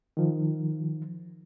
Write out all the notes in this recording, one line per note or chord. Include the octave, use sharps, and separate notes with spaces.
D#3 F3